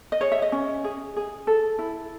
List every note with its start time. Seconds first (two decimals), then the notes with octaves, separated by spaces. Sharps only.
0.12 D#5
0.21 G#4 C#5
0.32 E5
0.42 D#5
0.52 C#4
0.84 G#4
1.16 G#4
1.47 A4
1.79 E4